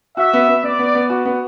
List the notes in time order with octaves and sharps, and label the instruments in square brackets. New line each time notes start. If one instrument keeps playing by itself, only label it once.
[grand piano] F#4 [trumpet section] E5
[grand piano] B3
B3
[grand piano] B3 [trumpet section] D5
[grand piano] B3
B3
F#4
B3